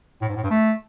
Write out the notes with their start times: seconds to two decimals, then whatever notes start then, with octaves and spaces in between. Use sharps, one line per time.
0.22 A2
0.29 G#2
0.36 A2
0.43 G2
0.50 A3